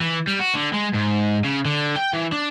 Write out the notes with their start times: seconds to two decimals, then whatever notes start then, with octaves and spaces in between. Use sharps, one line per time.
0.01 E3
0.27 G3
0.40 F#4
0.55 D3
0.74 G#3
0.94 G#2
1.45 C#3
1.65 D3
1.96 G5
2.13 E3
2.32 D4